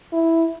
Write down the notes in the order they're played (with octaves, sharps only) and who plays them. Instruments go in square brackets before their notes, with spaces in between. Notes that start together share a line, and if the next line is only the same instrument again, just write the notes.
[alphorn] E4